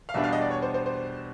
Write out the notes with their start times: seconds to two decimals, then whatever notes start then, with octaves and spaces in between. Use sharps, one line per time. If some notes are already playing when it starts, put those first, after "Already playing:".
0.09 F5
0.14 E2 B2 G3 B3 D4 E5
0.24 F5
0.33 D#5
0.41 D5
0.51 C#5
0.62 C5
0.74 C5
0.86 C5